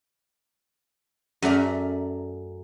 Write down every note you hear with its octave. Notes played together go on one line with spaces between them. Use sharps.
F#2 A3 D5 A#5